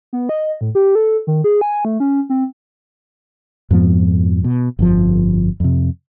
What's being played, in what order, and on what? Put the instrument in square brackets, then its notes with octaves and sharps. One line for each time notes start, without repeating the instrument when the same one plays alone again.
[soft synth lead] B3
D#5
A2
G4
A4
D#3
G#4
G#5
A3
C#4
C4
[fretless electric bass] F2 G#2 F3 B3
B2
G1 F2 F3
F2 C3